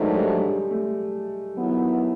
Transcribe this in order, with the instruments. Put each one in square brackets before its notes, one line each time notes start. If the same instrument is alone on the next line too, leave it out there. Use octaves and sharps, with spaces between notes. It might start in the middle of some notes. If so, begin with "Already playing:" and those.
Already playing: [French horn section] G#2 D#3 F#3 A3 D4 [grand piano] G#3
[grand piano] G3
G3
G#3
A3
[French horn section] D#3 F#3 B3 E4